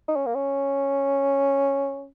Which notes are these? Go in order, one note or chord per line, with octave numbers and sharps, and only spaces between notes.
D#4
C#4
A#3
C#4